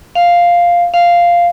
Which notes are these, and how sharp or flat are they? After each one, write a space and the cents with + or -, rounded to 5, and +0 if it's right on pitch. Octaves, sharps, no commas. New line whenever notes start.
F5 +0
F5 -5